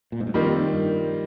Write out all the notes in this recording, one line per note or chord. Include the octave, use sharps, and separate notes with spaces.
A#2
G#2
G2
F2 D#3 G3 A#3 F4
G2